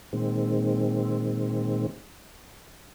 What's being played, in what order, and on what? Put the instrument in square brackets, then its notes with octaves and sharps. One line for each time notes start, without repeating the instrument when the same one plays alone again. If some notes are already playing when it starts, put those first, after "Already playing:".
[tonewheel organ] A#2 D#3 G#3 C4